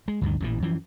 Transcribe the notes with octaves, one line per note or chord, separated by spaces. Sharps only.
G#3
D2 G2 D#3
A1 G2 A#2 E3
F#2 E3 F3